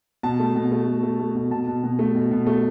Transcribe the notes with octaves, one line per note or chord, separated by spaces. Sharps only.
B2 A5
A3
B2
A3
A3
A3
A3
B2
B2 A5
B2
B2
A3
B2
B2
A3